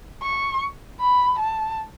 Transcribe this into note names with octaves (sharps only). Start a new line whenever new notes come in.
C#6
B5
A5